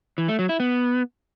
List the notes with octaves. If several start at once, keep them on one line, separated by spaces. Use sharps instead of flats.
E3
A3
F#3
E4
B3